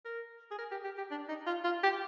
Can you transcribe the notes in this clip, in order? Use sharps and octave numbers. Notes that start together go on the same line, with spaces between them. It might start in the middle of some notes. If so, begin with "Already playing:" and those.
A#4
G#4
A#4
G4
G4
G4
D4
D#4
F4
F4
G4